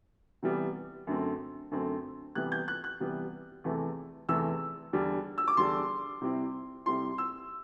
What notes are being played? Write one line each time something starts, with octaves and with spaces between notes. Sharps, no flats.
C3 E3 G3 B3
F#2 D3 A3 C4
F#2 D3 A3 C4
C3 E3 G3 B3 F#6
G6
F#6
F#6
C3 E3 G3 B3
E2 C3 E3 A3
E2 C3 E3 A3 E6
E2 D3 G3 D4
E6
D6
E2 D3 G3 D4 C6
C3 G3 C4 E4
C3 G3 C4 E4 C6
E6